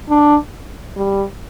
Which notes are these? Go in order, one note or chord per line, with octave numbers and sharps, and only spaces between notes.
D4
G3